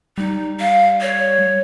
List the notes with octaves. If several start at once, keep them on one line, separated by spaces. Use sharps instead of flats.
G3 D#4
F5
C#5